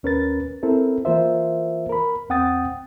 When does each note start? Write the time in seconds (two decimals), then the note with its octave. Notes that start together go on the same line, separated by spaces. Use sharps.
0.03 D#2 C#4 A#4 B4 A6
0.63 C4 E4 A4 A#4
1.05 E3 A#3 F4 A#4 C5 E5
1.89 A#4 B5
2.29 E2 C4 F#5 G5 D#6 A6